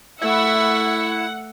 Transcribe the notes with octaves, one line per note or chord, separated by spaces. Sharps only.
A3 E4 E5 F#5 C#6